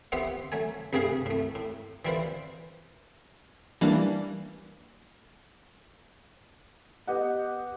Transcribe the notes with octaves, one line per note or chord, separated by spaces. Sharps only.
B3 F4 G4 C5 E5 F#5
F#3 A3 G#5
C2 G2 C3 A3 G#4 F5
A2 A3
A2
E3 G3 E4 F4 B4 C5
E3 G3 A#3 D4
B3 G4 D#5 F#5